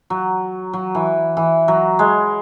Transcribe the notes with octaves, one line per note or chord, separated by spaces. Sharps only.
F#3
F#3
E3
E3
F#3
G#3